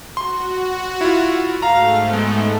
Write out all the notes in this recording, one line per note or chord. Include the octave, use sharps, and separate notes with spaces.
F#4 C6
E4 F4
G#2 A3 F5 A#5
G#3 B3